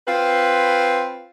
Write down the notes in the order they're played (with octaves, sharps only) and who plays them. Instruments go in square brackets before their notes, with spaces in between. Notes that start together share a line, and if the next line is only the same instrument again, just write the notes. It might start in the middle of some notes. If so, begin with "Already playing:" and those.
[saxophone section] C4 F4 B4